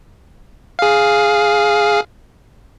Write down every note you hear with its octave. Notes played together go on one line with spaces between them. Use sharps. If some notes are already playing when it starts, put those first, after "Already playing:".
G#4 F5